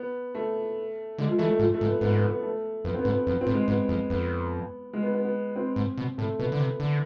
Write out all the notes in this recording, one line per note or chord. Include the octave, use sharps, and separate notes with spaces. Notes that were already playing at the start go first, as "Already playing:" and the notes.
Already playing: B3
A3
D3 G#3
F3
E3 A3
A3
G#2 F3
A3
G#2
B3
G#2 B3
B3
B3
A3
F2 B3
C4
B3
G#2
B3
F2 B3
C4
A2
G#3
G#2 B3
F2
F2 B3
G#3
B3
B3
B3
C4
G#2
B2
A2 A3
B2 B3
D3
C3
D3